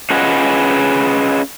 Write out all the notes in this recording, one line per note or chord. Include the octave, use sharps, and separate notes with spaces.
C#4 F4 G#4 B4 D#5 F#5